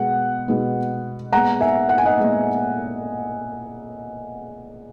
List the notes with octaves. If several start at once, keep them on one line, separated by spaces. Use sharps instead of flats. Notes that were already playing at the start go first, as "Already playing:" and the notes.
Already playing: B2 G#3 B3 F#5
B2 G#3 B3
A#2 G#3 B3 F#5 A#5
E5 G#5
F#5
G#5
D#5 F#5
A#2 G#3 B3